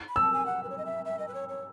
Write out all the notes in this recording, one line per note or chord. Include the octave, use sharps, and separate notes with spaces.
B5
A5 E6
G#5
F#5
B4
C#5
D#5
E5
E5
D#5
B4
C#5
C#5